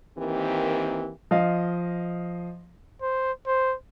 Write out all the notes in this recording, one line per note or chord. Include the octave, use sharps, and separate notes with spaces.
D#3 E3 A#3 C4 G4
F3 D#5 F5
C5
C5